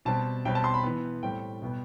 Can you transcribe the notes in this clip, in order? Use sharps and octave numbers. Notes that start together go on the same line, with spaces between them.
B2 G3 C4 A5
B2 G3 C4 G5
A5
C6
B5
E3 B3
A2 G3 C4 G5
B2 G3 B3